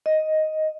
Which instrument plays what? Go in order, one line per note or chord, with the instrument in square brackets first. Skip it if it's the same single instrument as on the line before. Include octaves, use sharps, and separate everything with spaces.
[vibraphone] D#5